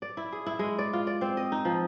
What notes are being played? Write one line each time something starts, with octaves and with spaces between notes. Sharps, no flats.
D5
E4
G#4
E4
G#3
D5
F4
D5
C4
D#5
D#4
F3